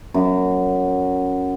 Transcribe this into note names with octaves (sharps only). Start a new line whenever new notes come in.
F#2